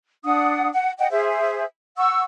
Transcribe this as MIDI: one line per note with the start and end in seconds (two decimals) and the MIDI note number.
0.24 0.68 62
0.24 0.68 78
0.24 0.68 87
0.74 0.91 78
0.98 1.09 75
0.98 1.09 78
0.98 1.09 79
1.11 1.64 68
1.11 1.64 72
1.11 1.64 76
1.97 2.22 78
1.97 2.22 85
1.97 2.22 88